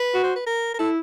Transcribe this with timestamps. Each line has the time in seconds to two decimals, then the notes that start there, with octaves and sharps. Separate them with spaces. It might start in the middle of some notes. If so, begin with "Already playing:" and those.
Already playing: B4
0.14 F#4
0.23 C5
0.36 B4
0.46 A#4
0.74 A#4
0.79 E4 A4